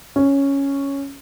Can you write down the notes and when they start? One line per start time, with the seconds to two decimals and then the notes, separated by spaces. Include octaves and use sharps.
0.16 C#4